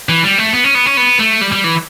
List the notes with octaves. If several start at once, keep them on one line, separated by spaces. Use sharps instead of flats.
E3
G3
A3
B3
C#4
B3
C#4
B3
A3
G3
G3
E3